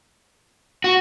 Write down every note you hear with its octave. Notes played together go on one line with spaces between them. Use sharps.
F#4